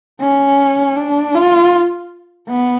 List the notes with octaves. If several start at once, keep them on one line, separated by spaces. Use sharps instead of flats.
C#4
D4
F4
B3